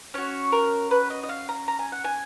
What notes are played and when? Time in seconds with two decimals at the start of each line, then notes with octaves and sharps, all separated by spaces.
0.14 C#4 F#4 C#5
0.52 A#4
0.91 B4
1.10 D#5
1.23 D#5
1.29 F5
1.49 A#5
1.68 A#5
1.79 G#5
1.92 F#5
2.04 G#5